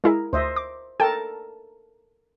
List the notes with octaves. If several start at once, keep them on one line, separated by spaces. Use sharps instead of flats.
G#3 E4 G#4 A#4
D2 C5 D#5 E5
D6
A4 A#4 G5 A5